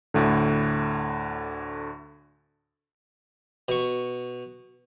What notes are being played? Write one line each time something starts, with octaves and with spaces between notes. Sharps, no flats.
D2 A2 D3
B2 C#6